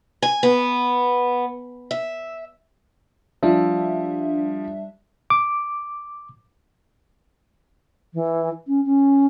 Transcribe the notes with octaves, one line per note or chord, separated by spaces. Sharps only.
G#5
B3
E5
F3 G3 D4 E5
D6
E3
C#4
C#4